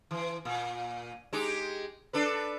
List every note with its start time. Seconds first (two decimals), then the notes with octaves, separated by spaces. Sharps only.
0.11 E3
0.45 A#2
1.33 G#3 D#4 G4
2.13 D4 A4 B4